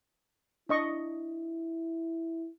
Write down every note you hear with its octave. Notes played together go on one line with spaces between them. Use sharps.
D4 E4 D#5 C#6